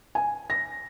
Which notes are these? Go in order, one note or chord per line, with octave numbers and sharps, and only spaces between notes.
G#5
A#6